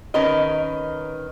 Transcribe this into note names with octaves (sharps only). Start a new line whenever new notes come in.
D#3 C#4 A#4 B4 D#5